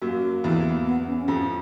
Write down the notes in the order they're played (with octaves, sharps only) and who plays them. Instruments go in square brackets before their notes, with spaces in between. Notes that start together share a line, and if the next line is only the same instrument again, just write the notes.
[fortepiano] F#2 F#3 [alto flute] A#3
[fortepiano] E2 E3
[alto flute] B3
C#4
C#4
[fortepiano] F2 F3